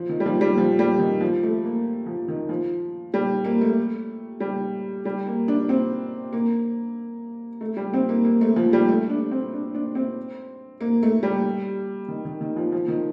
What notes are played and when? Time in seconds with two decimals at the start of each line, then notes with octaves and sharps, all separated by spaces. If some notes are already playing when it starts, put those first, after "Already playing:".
Already playing: F3
0.09 D#3
0.20 G3
0.26 F3
0.41 G3
0.58 F3
0.79 G3
0.99 D#3
1.21 F3
1.43 A3
1.64 A#3
2.06 F3
2.28 D#3
2.49 F3
3.14 G3
3.45 A#3
3.61 A3
4.40 G3
5.05 G3
5.27 A#3
5.48 D4
5.69 C4
6.33 A#3
7.61 A3
7.77 G3
7.93 C4
8.09 A#3
8.25 A#3
8.41 A3
8.56 F3
8.73 G3
8.89 A3
9.10 D4
9.31 C4
9.53 D4
9.74 D4
9.95 C4
10.81 A#3
11.03 A3
11.23 G3
12.08 D#3
12.25 D#3
12.41 D#3
12.56 F3
12.72 F3
12.88 D#3